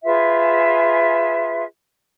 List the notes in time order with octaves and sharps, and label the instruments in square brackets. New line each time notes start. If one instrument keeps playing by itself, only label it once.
[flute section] F4 G#4 B4 E5